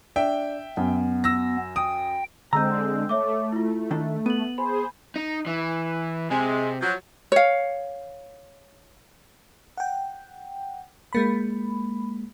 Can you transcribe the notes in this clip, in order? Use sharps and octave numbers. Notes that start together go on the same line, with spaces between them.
D4 E5 G5
F#2 B3
E6 A#6
G5 D#6
D3 G#3 C4 D#5 A#5 E6 G6
A3 C#5 E5 D6
E4 F4
D#3 D4 A4
B3 D#7 F#7
G#4 C5 B5
D#4
E3
C3 G#3
F3 F#3
C#5 F5
F#5 G5
G#3 A#3 B5